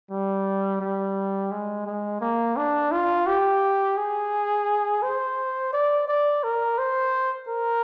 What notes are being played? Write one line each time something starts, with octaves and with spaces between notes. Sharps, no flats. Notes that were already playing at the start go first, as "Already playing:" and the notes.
G3
G3
G#3
G#3
A#3
D4
F4
G4
G#4
C5
D5
D5
A#4
C5
A#4